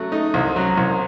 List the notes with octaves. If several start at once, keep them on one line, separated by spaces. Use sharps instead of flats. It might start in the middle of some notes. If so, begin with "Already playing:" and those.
Already playing: F#3 A3 F#4
A3 D#4
C2
F#3
C2